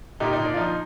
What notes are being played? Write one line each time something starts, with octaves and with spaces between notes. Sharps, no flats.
A#2 D#4 G4
D#4
A#2 D4
F4
F3 D#4